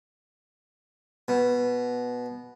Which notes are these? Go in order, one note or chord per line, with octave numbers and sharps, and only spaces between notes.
B2